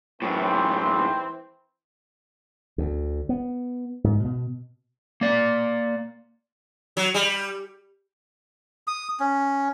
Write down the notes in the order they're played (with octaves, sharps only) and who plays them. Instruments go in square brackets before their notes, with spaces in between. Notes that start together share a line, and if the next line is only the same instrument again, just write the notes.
[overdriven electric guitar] F#2 A2 [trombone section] E3 C4
[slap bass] D2
B3
G#2
B2
[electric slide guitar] A#3 D5
[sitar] F#3
G3
[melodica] D#6
C#4